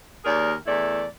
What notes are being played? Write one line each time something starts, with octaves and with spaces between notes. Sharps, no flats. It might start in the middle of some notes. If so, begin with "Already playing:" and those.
D#2 G#4 A#4 D5
E2 A3 E4 D5